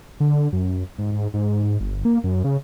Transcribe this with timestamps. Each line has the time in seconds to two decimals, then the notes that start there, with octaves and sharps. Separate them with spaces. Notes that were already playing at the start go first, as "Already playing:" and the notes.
0.20 D3
0.53 F#2
0.98 G#2
1.12 G#2
1.34 G#2
1.63 G#2
1.81 G1
2.05 A#3
2.24 F#2
2.44 C#3